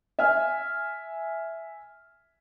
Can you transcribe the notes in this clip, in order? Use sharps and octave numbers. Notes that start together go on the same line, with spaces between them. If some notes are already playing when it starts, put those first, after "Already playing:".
E5 G#5 F6